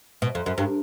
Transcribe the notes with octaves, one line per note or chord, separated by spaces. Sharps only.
B2
F2
F#2
G2